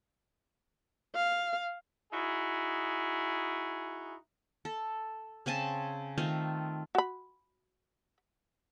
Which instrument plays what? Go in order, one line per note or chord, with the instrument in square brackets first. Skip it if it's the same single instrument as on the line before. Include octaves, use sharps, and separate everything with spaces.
[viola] F5
[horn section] D#4 E4 F#4 G#4
[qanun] A4
C#3 C4 G#5 A5
D#3 A3 C4 F4
[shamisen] F#4 B5